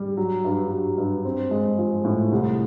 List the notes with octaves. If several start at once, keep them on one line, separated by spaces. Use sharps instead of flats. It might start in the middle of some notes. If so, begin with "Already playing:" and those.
Already playing: G3
F#3
G2
F#3
G2
C4
G#3
F3
A2
C2